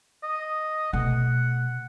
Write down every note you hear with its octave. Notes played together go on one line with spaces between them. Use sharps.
D#5
B2 A3 F#5